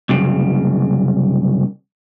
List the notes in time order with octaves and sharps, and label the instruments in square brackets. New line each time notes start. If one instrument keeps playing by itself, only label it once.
[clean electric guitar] C2 F#2 C#3